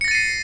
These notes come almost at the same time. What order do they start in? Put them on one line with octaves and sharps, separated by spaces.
C#7 A#6 A6 D#7 C7